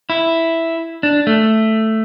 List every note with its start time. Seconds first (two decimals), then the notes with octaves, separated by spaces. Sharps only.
0.10 E4
1.03 D4
1.27 A3